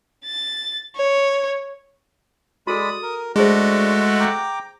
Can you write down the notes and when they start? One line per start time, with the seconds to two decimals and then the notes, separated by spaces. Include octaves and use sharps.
0.25 A6
0.96 C#5
2.67 G#3 F#4 A4 D5 B5 D#6
3.03 A#4
3.36 G#3 A3 D4 F#4 G#4 C5
4.20 G5 A#5 D6